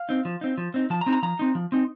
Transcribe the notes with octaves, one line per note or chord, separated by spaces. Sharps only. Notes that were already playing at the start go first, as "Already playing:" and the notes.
Already playing: F5
C4 D#4
F3
C4 D#4
F3
C4 D#4
F3 A5
A#5
C4 D#4
A#5
F3 A#5
C4 D#4
F3
C4 D#4